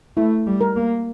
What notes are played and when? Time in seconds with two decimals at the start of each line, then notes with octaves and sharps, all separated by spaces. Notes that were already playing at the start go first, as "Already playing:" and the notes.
0.17 A3 E4
0.47 G3
0.61 A#4
0.76 A#3